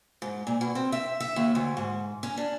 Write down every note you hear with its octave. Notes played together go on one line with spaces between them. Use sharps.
G#2
A#2
B2
C4
E5
E5
D#2
D2
G#2
C#4
D4